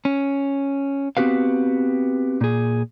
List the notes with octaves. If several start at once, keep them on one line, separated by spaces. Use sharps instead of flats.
C#4
B3 C4 F#4 G4 B4 F5
A#2 G#4